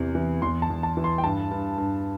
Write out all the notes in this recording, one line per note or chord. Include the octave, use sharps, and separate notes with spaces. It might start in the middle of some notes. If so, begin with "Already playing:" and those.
Already playing: E2 C3 E3
E3
E2 C6
A5
E2
A5
E3
C6
G5
G2 A5
G2
G2